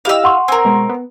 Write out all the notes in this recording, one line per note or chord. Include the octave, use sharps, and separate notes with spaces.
E4 G4 D#5 F5 E6
F#5 C6 C#6
C4 A#4 G#5
B2 G#3
B3